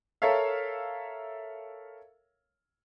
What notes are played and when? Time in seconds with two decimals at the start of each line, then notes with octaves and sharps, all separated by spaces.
0.22 A4 A#4 C#5 E5 F5